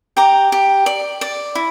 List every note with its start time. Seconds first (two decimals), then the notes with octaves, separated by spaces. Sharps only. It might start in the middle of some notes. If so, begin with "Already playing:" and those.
0.17 G4 A#5 D6
0.52 G4
0.86 D5
1.21 D5
1.55 E4